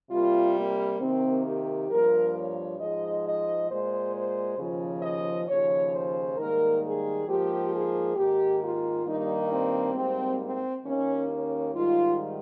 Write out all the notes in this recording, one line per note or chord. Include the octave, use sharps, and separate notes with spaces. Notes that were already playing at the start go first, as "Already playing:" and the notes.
C3 G3 A#3 F4
A#3
C3 D#3 A#3 C4
G4
G2 F3 A#3 A#4
C#5
G#2 F3 G#3 D#5
D#5
A#2 G#3 C5
C5
D#2 C#3 F3
D#5
D#2 C#3 F3 C#5
C5
G#2 D#3 G3 A#3 A#4
G#4
G#2 F3 A#3 G4
G#4
G#2 D#3 A#3 G4
F4
G2 D#3 G3 A#3 D#4
C4
G#2 G3 A#3 C4
C4
D#2 D#3 A#3 C#4
C#4
G#2 D#3 G3 F4